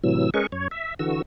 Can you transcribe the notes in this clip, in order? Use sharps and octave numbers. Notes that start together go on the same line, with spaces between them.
A2 C3 E3 F#3 E6
G#3 C#4 G#4 A#4 B4 C#6
F#2 C#5
E5
D3 E3 F#4 E6